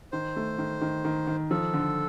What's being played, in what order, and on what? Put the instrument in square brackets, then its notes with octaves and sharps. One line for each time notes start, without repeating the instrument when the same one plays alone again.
[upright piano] D#3 [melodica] C5
[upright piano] A3
D#3
D#3
D#3
D#3
[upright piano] F3 [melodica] A4
[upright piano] D3